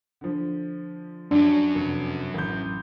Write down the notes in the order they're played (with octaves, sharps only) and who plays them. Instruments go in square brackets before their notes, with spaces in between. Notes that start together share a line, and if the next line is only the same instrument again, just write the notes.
[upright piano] D3 F3
[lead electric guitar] F#2 F#3 [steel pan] D4
[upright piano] F1
A1 G6